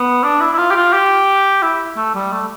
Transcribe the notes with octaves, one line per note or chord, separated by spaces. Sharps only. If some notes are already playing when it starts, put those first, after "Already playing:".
Already playing: B3
D4
E4
E4
F4
G4
F4
G4
E4
A3
G3
A3